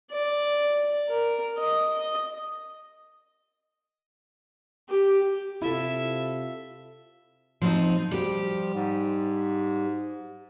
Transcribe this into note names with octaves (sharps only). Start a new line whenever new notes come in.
D5
A#4
D#5
G4
C3 E4 F4 A4 E5
F3 C4 D#4
F3 G3 G4
G#2